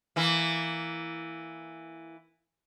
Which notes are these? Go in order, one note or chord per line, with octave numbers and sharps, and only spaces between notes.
E3 A#3